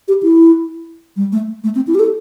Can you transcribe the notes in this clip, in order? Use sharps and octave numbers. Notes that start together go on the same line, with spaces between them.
G4
E4
G3
A3
A3
C4
E4
G4
A4